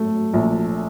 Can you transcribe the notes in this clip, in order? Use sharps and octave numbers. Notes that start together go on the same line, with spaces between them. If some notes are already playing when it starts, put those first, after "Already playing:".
Already playing: F#3 A3
A#1